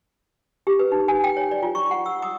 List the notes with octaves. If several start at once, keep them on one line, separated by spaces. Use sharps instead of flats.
G4
B4
D#4
G#5
G5
C#5
D5
F4
C#6
F#5
E6
D#6